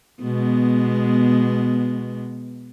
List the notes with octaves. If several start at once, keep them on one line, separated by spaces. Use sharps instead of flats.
B2 G#3 B3